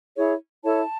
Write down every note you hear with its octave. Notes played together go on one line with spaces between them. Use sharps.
E4 G#4 C#5
E4 A4 C#5 A5